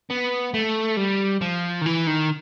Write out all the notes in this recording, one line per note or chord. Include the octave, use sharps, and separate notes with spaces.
B3
A3
G3
F3
D#3
E3
D#3